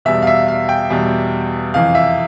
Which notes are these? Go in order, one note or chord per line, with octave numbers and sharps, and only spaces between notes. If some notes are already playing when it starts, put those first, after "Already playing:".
E2 B2 G3 E5
F5
E5
F5
G5
E2 B2 G3
F2 C3 E3 F5
E5